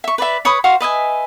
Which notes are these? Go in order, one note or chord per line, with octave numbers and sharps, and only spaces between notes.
E5 C#6
B4 D5 E5
B4 C#5 B5 D#6
F#4 C5 F5 C#6
B4 D#5 E5 G#5